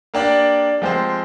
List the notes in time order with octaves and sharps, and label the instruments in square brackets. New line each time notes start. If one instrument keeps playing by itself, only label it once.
[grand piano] A#3 D4 G4 D5
F3 G#3 C4 G4 C5